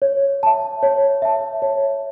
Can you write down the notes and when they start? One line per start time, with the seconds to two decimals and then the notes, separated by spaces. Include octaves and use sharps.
0.02 C#5
0.43 E5 A5
0.83 C#5
1.22 E5 A5
1.62 C#5